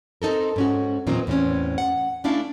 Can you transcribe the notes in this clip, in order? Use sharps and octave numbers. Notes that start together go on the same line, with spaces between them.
C4 D#4 A4 A#4
G#2 C#4 F#4
E2 A#2 D#3 F#3 C4 D#4
E2 A2 C4 C#4
F#5
A3 C#4 D4 E4 F5